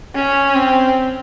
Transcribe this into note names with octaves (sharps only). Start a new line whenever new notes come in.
C#4
C4